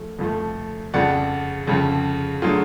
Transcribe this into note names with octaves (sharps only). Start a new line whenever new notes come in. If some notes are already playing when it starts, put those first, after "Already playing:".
Already playing: F3 A3
F2 F3 A3
F2 C#3 F3 D5 F#5
F2 C#3 F3
D3 F#3 A3 F4 G#4